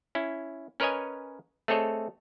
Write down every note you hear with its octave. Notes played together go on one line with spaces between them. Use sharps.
C#4 E4
C#4 A#4 B4 C#5 D#5 G#5
A3 C4 G#4 A4 C#5 D#5